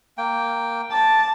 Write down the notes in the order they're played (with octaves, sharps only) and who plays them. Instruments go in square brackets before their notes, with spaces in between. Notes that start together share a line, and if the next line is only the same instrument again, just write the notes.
[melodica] A#3 G5
[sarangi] A5 [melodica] D6